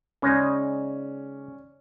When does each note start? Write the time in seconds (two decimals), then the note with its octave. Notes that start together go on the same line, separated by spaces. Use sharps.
0.22 C#3 G#3 C#4 D#4 D5